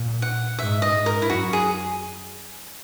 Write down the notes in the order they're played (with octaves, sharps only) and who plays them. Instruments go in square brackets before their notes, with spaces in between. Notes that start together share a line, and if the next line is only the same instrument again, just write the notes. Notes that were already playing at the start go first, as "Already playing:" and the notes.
Already playing: [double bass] A#2
[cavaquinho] F#5
[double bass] G#2 [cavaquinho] E5
[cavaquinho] D#5
[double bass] G#2
[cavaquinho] A#4
E4
[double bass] F#2 [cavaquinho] F#4
[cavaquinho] G#4